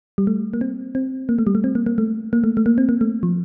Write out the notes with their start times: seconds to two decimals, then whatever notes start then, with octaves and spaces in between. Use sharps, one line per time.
0.18 G3
0.27 A3
0.54 A#3
0.61 C4
0.95 C4
1.29 A#3
1.39 A3
1.47 G3
1.55 A3
1.64 C4
1.75 A#3
1.86 A#3
1.98 A3
2.33 A#3
2.44 A3
2.57 A3
2.66 A#3
2.78 C4
2.89 A#3
3.01 A3
3.23 F3